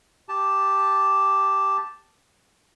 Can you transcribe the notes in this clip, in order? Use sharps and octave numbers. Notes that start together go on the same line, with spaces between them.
G4 A5